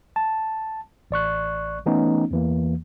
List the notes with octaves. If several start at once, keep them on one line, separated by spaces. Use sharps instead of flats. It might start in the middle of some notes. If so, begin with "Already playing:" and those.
A5
A1 D5 C#6 F#6
E3 A3 B3 C#4 D#4
E2 E3 A#3